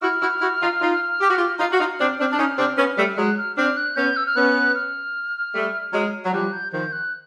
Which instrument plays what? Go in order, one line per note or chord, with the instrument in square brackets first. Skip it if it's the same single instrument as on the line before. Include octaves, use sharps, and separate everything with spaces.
[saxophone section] E4 F#4 [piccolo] F6
[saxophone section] E4 F#4
E4 F#4
D#4 F4
D#4 F4
G4
F#4
F4 G4
[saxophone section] D#4 F4 [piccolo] F6
[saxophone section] F#4
D#4 F4
C4 D4
C4 D4
D4
C#4 D#4
C4 D4
B3 C#4
G3 A3
[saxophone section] F#3 G#3 [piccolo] F#6
[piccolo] F6
[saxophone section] C4 D4 [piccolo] F6
[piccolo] F#6
[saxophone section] B3 C#4 [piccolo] G6
[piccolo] E6
F6
[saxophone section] B3 C#4 [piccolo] F#6
[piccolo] F6
[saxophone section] G3 A3
F#3 G#3
F#3
[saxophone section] F3 G3 [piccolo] F#6
[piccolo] G6
[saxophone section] D#3 F3 [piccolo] G6
[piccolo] F#6